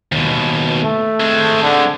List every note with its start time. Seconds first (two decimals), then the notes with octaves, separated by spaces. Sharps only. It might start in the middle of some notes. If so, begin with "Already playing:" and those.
0.12 D#2 B2
0.84 A3
1.20 G#3 C4
1.63 D3